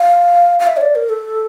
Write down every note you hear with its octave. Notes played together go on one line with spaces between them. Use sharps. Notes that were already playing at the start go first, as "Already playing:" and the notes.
Already playing: F5
F5
E5
C#5
D5
A#4
A4